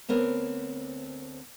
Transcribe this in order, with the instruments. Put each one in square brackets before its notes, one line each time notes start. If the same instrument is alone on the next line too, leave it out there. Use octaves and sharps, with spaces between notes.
[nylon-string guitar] D2 B3 C4 A#4 C#5